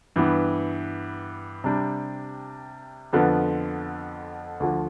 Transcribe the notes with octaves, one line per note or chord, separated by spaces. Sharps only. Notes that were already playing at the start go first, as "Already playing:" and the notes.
G2 E3 B3
C3 G3 D4
F2 D3 F3 B3
D2 D3 F3